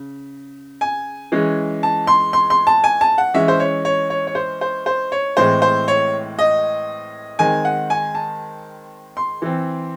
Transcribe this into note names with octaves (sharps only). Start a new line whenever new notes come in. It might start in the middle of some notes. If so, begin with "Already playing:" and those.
Already playing: C#3
G#5
E3 G#3 C#4
A5
C6
C6
C6
A5
G#5
A5
F#5
E3 G#3 C#4 E5
C5
C#5
C#5
C#5
C#5
C5
C5
C5
C#5
A2 E3 G#3 C4 C5
C5
C#5
D#5
D#3 G#3 C4 G#5
F#5
G#5
A5
C6
E3 C4